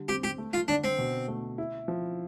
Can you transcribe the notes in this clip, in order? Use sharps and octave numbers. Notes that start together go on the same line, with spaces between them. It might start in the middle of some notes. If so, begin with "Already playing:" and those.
Already playing: D3 G3
C4 G4
G4
A3
F4
D3 D4
C4
B2
A3
E4
F3